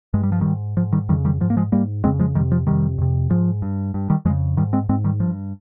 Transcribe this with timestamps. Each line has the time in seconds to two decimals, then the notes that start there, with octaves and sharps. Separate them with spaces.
0.14 G2 G#3
0.23 G3
0.32 F3
0.41 G#2 D#3 G3
0.77 G#2 F3
0.92 D#3 G3
1.09 F2 D#3 G3
1.12 C#3
1.25 D#3 G3
1.40 G#2 F3
1.50 A#3
1.57 F3 G#3
1.72 G#2 G3 A#3
2.04 F2 C#3 G#3 C4
2.19 F3 G#3
2.35 F2 D#3 G3
2.39 C3
2.52 F3
2.67 F2 C3 D#3 G3
2.98 F2 C3
3.30 G#2 F3
3.62 G2
3.94 G2
4.10 D#3 G3
4.25 F2 F3 G#3
4.30 C#3
4.57 G#2 D#3 G3
4.73 G#3 C4
4.89 G#2 G#3 C4
5.04 D#3 G3
5.20 G2 F3